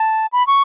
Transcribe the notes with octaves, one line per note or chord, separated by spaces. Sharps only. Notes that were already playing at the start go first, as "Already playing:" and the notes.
Already playing: A5
B5
C#6